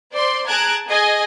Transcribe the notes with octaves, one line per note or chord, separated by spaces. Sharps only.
C5 D5 C6
G#4 A5 A#5 F#6 G#6 D7
G#4 D#5 G#5